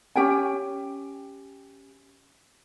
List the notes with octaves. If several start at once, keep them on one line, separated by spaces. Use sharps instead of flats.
C#4 G4 G5 G#5